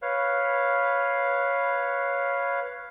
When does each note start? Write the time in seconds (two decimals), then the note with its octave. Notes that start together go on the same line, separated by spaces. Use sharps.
0.02 B4 C#5 F5